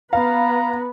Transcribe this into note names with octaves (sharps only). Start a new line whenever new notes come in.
B3 B4 F5 A#5